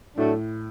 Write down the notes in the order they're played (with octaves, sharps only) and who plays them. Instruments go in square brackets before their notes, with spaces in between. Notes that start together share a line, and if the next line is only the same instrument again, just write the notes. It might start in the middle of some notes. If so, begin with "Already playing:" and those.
[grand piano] A2 [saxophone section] F#3 A3 D4